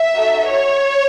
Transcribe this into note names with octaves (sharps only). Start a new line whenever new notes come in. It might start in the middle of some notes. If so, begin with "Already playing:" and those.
Already playing: E5
D#4 F#4 A4
C#5